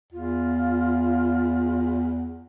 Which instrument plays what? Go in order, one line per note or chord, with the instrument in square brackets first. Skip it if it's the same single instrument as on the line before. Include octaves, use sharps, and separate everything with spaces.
[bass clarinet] E2 [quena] F4